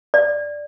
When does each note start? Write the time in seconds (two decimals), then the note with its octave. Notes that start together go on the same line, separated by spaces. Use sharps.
0.14 D5